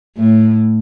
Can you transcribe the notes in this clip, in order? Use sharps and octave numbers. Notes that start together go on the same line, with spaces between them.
A2